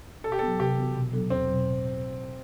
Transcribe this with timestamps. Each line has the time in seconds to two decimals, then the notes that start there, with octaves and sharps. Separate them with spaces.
0.24 B2 A4
0.32 G4
0.39 A4
0.42 F#3 B3
0.60 C3 G4
0.77 E3 B3 F#4
0.95 B2
1.13 F#3 B3 D4 A4
1.30 E2 C4
1.48 B2 F#3
1.66 A2